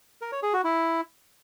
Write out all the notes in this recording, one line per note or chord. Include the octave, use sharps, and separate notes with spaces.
A#4
C#5
G#4
F#4
E4